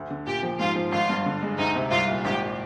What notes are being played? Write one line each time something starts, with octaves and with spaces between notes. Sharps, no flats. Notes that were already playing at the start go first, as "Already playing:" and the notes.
Already playing: D2
D3
A#2 G4
F3
G#2 F4
F3
G#1 F4
G2
D3
G#3
D2 D#4
C3
C2 F4
A#2
G#1 G4